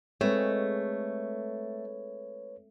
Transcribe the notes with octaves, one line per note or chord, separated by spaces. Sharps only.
G#3 A3 C4 G#4 B4 C#5